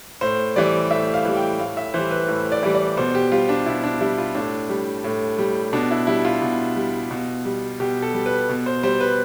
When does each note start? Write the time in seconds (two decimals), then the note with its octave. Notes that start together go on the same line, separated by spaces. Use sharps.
0.21 A2 C5
0.56 E3 G3 D5
0.91 A2 E5
1.14 F5
1.25 E3 G3
1.36 G5
1.59 A2 F5
1.77 E5
1.94 E3 G3 C5
2.11 B4
2.28 A2
2.52 D5
2.63 E3 G3
2.74 D5
2.97 B2 C5
3.15 G4
3.32 G3 F4
3.49 D4
3.66 B2 E4
3.84 D4
4.01 G3 E4
4.18 F4
4.35 A2 D4
4.69 G3
5.04 A2
5.39 G3
5.73 B2 D4
5.91 E4
6.07 G3 E4
6.25 F4
6.42 B2
6.76 G3
7.11 B2
7.45 G3
7.80 B2 G4
8.02 A4
8.14 G3
8.26 B4
8.49 B2
8.66 C5
8.83 G3 C5
9.00 B4